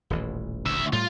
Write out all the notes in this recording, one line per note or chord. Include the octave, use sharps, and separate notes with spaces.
D#1 A1 E3
D2 E5
A2 G3 F4